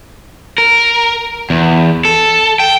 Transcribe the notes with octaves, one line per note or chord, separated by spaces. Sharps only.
A#4
E2
A4
G5